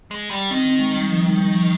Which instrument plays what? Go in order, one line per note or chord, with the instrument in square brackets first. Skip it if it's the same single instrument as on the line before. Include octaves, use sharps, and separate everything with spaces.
[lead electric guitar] G#3
G3
[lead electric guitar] D#3 [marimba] C4
[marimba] C4
G#3
G3
F3
G3
G3
F3